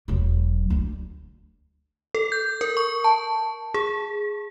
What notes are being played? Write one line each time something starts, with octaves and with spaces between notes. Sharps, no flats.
E1 F#3
D2 D3
A4
G6
A#4
C#6
A5
G#4